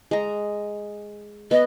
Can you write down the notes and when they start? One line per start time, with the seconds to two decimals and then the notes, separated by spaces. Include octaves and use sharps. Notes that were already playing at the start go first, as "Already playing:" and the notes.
0.11 G#3 A#5
1.51 B3 D#5